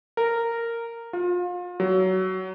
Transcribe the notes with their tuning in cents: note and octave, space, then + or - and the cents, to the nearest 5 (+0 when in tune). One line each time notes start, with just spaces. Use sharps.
A#4 -10
F4 +30
F#3 +20